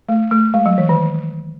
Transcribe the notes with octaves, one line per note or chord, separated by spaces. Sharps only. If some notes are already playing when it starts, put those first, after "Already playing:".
A3
A3
G#3
F#3
E3
D#3